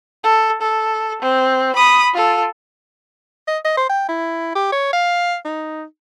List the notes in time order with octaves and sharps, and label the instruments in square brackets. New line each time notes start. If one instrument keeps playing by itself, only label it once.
[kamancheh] A4
A4
C4
B5 D#6
F4 A4
[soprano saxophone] D#5
D#5
C5
G5
E4
G4
C#5
F5
D#4